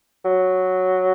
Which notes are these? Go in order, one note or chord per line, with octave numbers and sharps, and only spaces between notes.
F#3